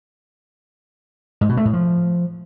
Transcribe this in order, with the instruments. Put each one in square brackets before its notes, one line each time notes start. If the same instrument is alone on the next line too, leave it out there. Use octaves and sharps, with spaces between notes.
[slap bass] G#2
B2
A3
A2
F3